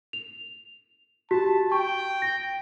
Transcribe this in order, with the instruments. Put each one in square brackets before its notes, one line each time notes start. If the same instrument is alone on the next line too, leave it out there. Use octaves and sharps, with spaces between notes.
[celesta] F7
[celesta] F#4 G4 [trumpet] A5
[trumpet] G5 [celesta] C#6
[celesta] A#6